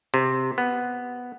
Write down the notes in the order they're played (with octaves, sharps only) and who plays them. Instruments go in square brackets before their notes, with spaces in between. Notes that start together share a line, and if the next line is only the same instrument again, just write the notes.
[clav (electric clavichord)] C3
B3